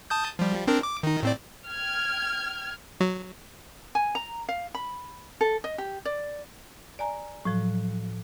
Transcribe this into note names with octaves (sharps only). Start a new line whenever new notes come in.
A5 D#6 G6
F3 G3
C4 D4 A#4
D6
D#3 D#4
A2 C4 D5
G5 F6 G#6
F#3
G#5
A#5
F5
B5
A4
D#5
G4
D5
D5 G#5 A#5
A2 F3 F#3